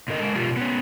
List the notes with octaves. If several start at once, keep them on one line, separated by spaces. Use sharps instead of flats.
A#2 D3 A#4 D#5
G#3 A#4
B2 F4 G4
B3 C#4